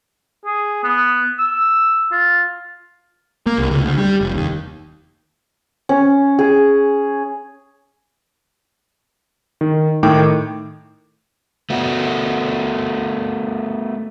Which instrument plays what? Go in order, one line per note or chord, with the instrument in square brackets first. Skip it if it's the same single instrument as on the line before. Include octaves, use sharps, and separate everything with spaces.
[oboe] G#4
B3
E6
F4
[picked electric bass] A#3
C2
C#2
D2
G3
F1
D#2
[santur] C#4
G#4
[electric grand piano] D#3
A2 D#3 G5 D6
[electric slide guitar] A3 B3 F#4